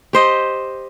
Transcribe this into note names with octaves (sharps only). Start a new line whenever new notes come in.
G4 C5 D#5